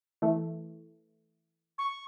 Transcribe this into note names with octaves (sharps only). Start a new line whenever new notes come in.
E3 A3
C#6